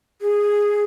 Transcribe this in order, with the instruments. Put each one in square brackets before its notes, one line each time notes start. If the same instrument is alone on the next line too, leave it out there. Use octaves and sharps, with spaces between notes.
[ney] G#4